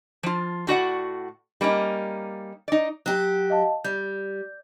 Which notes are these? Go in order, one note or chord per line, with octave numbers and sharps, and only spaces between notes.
F3 F4
A2 F#4 D5 F#5
G3 A#3 C#4 D#4
D#4 D5
F#3 G4 F#6
D#5 F5 A5
G3 G6